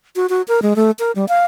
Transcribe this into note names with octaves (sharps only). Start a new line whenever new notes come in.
F#4
F#4
A#4
G#3
A3
A#4
G3
F5